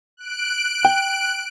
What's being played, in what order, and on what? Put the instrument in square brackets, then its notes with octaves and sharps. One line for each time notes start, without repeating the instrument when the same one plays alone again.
[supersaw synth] F#6 D7
[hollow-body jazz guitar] G5